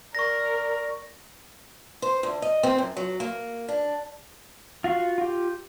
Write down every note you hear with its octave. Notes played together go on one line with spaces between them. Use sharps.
A#4 D5 C#6 A#6
C5
D2
D#5
C4
F#2
F#3
A#3
D4
F4 F#4 F5 C#6
F4 G4